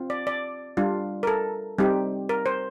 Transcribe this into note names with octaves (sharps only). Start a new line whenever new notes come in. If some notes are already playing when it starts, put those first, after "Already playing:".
Already playing: C4 F4
D5
D5
G3 D4 F4
A#4
A4
G3 C4 D#4 G4
A#4
C5